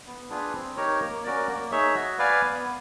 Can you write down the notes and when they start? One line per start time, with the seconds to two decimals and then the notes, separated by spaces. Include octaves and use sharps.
0.07 B3
0.30 D4 F4 G#4 B4
0.54 C4
0.77 D#4 G4 A#4 C#5
1.01 A#3
1.24 C#4 F#4 A#4 D5
1.48 A#3
1.72 D#4 G#4 C#5 E5
1.95 F#4
2.19 B4 D5 F5 G#5
2.42 B3